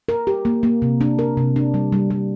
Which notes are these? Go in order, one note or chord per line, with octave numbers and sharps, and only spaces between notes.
A#4
G4
A#3
A#3
C3
D4
A#4
C3
D4
G3
G3
G3